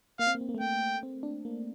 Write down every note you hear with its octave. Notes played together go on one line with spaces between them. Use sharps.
A#3 F5
C4
A#3
C4
A#3
A3
A#3 G5
C4
D4
A#3